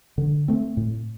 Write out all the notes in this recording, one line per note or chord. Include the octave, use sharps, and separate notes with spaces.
D3
A3 C4
A2